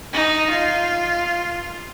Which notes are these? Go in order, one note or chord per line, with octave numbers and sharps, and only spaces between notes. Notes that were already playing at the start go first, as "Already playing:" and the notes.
D#4
F4